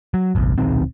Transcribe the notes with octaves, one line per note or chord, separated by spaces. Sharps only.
F#3
F#1 B1
D#1 B1 D#3 C4